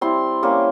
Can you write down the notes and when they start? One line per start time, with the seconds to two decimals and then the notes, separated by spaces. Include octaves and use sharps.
0.01 G3 C4 E4 C6
0.43 G3 A#3 C#4